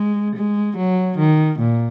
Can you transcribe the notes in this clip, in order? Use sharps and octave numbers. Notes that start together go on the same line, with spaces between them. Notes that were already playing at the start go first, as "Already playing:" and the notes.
Already playing: G#3
G#3
F#3
D#3
A#2